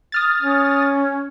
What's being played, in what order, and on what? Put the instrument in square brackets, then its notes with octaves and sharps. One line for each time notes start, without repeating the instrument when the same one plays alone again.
[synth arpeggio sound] D#6 F6 A6
[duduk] C#4